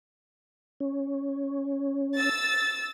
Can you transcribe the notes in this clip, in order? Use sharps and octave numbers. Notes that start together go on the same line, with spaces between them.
C#4
E6 A6